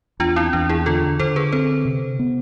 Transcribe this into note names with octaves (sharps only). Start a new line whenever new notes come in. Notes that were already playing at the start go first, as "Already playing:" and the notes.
E2 D4 F4
C4 E4
E2 D4
E4 G#4
D3 F4 A4
D3 A4 C5
G#4 B4
C4 A4 C5
C3
B3